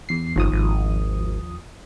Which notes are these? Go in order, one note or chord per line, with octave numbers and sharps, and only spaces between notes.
E2 C7
G1 D#2 F3 D#6
G#1